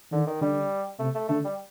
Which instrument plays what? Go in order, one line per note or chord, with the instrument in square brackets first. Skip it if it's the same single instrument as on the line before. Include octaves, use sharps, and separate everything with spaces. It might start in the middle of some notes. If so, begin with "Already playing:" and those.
[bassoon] D3 [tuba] D#3
[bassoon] D#3
[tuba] D3 [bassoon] G3
[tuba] C3 [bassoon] A3
[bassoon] A3
[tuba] D3 [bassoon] A3
[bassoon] G3